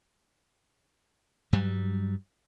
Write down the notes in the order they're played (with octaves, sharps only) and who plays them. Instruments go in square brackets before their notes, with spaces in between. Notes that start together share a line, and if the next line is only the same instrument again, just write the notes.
[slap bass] G2 F#3 G3